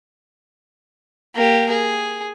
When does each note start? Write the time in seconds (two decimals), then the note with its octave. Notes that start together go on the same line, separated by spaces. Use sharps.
1.35 A#3 G4
1.69 G#4